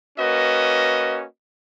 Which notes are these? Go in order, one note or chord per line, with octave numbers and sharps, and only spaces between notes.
A#3 C#4 F#4 B4 D#5